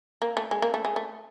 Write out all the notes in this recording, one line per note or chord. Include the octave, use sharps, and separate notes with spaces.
A#3
A3
G#3
A#3
A3
G#3
A3